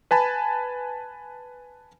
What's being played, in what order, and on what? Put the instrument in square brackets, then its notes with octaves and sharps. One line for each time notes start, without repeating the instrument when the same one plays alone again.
[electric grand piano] B4 G#5 A5 B5